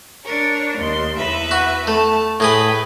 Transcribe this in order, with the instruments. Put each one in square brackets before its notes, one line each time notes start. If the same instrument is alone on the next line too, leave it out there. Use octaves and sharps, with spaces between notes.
[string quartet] D4 A#4 C#5
D#2 C6
E2 B4 E5
[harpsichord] F#4
[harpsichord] A3 [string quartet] A5
[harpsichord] A2 G#4 D#6 [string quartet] B4 G5